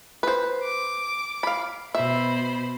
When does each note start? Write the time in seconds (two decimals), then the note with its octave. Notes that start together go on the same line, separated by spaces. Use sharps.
0.23 B4 C5
0.63 D6
1.43 F5 B5
1.95 B2 C5 E5 B5